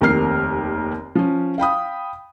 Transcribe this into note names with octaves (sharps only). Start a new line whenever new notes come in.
F1 D#2 C4 A#4 F6 C7
F3 C#4
F5 G5 B5 D#6